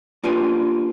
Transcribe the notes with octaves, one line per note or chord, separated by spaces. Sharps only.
A#3 D4 F4 G4 B4 G#5